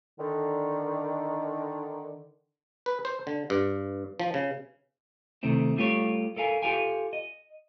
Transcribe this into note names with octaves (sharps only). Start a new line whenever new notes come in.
D3 D#3
B4
C5
D3
G2
F3
C#3
C3 D#3 A3 C4 E4
G3 A3 F4 G4 C#5
A4 A#4 F5 G#5
F4 G4 A4 F5 G5 G#5
D#5